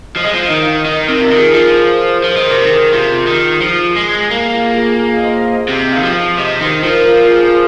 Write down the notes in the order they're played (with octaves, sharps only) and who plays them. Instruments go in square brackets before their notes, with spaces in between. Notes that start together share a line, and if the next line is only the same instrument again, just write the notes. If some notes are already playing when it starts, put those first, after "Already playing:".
[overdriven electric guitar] F3 [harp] D#5
[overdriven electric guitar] G#3
F3
[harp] D#5
[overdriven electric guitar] D#3
[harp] F5
[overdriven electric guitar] D#3 [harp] D#5
[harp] A#4
[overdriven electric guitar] C3
[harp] F4
[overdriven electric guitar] D#3
[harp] G#4
[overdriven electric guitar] F3 [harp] A#4
[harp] C5
[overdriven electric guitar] F3 [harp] C5
[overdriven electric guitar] D#3
[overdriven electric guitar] C3 [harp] A#4
[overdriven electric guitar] D#3 [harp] G#4
[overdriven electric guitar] C3 [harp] F4
[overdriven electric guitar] D#3
F3
G#3
[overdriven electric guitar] A#3 [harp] G#4
[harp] F4
G#4
G#4
F5
D#5
C5
D#5 F5
[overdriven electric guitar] C3 [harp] F5
[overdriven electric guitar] D#3 [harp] F5
[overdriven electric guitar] F3
[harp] F5
[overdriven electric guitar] C3 [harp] D#5
[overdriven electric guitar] D#3 [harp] C5
[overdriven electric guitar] F3 [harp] A#4
[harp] F4
A#4
G#4
C5